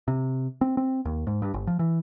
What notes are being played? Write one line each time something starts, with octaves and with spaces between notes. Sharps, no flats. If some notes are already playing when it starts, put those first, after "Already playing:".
C3
C4
C4
D#2
G#2
G2
G1
F3
E3